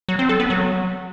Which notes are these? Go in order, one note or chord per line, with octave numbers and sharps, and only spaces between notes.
F#3
C4
A4
B3
F#3